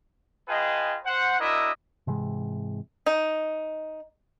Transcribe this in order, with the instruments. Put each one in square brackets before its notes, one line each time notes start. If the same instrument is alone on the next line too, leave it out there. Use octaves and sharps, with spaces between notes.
[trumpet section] F4 G#4 B4 D#5 G5 A5
C5 F#5
D4 E4 F#4 A#4 D#5 E5
[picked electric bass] G#2 C3 E3 G#3
[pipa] D#4